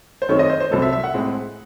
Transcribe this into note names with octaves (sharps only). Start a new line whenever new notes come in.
C5
F#2 D#3 A3 C4 C#5
D#5
C5
C5
C2 C3 F#3 A4
E5
E5
F#5
A2 G#3 C4